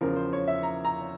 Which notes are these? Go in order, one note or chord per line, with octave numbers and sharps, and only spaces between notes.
E2 C#3 F3 A#4
C5
C#5
E5
A#5
A#5